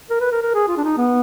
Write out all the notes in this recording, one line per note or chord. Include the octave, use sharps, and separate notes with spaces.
A#4
B4
A#4
A#4
G#4
F4
D4
D#4
B3